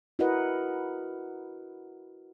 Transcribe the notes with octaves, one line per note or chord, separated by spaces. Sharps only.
E4 F#4 A#4 B4 D#5 F#5